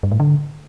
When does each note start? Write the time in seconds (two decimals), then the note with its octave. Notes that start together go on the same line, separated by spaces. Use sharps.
0.03 G2
0.11 A2
0.20 D3